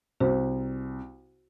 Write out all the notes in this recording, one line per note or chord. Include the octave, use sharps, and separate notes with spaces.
C2 F#4 C5